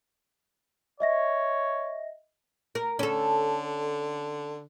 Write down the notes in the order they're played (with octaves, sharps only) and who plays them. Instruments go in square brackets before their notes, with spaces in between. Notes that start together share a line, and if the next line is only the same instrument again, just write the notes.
[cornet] C#5 [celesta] D#5 E5 A#6
[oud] A#4
[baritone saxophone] D3 [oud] C#4 A4